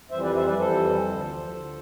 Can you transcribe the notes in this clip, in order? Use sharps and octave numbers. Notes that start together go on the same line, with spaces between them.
F2 E3 G3 C5 E5
B4 D5
C5 E5
B4 D5
F2 E3 G3 A4 C5
D2 D3 F3
D2 D3 F3